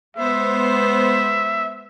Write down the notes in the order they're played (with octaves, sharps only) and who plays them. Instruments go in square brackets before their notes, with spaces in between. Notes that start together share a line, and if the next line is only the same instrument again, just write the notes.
[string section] G#3 B3 C5 [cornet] E5